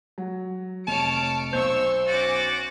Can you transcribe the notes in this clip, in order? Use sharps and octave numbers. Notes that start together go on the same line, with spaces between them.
F#3
F1 C#5 A5 F6 D7
B1 C5 C#6 E6 G6
C#4 F#4 D6 A6